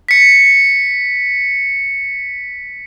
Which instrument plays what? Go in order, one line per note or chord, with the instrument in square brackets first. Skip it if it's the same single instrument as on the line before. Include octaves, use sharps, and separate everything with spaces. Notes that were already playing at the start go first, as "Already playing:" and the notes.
[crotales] B6 C#7